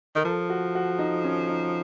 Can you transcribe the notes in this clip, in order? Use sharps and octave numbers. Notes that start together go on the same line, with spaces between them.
D#3 A#4
F3 A4
F#4
F#4
D#4
C#4
D#4